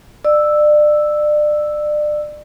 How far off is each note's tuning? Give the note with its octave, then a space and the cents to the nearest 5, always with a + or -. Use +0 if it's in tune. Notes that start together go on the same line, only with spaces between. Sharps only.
D5 +30 E6 +0